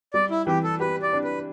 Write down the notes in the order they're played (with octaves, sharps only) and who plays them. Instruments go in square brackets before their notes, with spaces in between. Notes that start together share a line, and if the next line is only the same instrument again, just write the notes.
[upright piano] G3 [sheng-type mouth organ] D5
[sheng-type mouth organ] E4
[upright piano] E3 [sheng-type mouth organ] G4
[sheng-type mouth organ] A4
[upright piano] G4 [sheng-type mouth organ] B4
[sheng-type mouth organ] D5
[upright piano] D4
[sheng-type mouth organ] B4